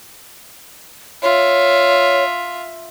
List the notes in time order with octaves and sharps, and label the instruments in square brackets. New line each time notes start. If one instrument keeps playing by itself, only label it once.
[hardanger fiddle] F4 E5 [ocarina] C#5